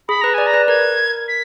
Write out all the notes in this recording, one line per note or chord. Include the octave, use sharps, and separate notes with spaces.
G#4 B5
B4 A#5
D5 G#5
A#5
B4
A#4 G#6
B6